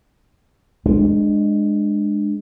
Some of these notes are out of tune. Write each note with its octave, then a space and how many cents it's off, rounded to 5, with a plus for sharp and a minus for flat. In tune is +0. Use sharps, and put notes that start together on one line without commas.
G#3 +0 D4 +20